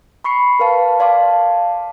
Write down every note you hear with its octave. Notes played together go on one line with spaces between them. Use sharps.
B5 C#6 C7 C#7
A#4 B4 F5 A5
D5 F5 A5 C6 D6